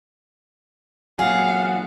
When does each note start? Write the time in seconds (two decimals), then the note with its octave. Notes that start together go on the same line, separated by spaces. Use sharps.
1.19 A#2 F#3 G#4 F5 F#5